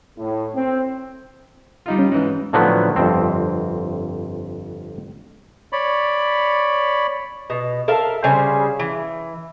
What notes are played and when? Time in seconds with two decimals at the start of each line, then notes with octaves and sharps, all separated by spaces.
0.18 A2
0.54 C4
1.86 G3 D#4 F4
1.99 C#4
2.12 G#2 E3
2.53 A2 D3 F3 F#3 B3
2.96 G1 F2 C4
5.72 C#5 D5 B5
7.50 B2
7.88 A4 A#4 E5 F5
8.24 C#3 G3 C5 G#5
8.79 E3